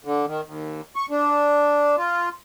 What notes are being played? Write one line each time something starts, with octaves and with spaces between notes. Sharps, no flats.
D3
D#3
D#2
C#6
D4
F4